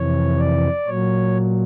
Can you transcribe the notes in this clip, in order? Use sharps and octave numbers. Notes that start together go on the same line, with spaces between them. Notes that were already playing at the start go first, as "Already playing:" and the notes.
Already playing: F2 C3 E3 C#5
D5
A#2 F#3 C#5